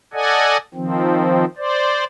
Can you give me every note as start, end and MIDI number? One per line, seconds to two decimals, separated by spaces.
0.13 0.57 69
0.13 0.57 74
0.13 0.57 75
0.13 0.57 78
0.13 0.57 80
0.74 1.45 51
0.74 1.45 53
0.74 1.45 60
1.57 2.04 72
1.57 2.04 74